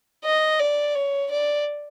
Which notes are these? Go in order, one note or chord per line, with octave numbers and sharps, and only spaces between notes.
D#5
D5
C#5
D5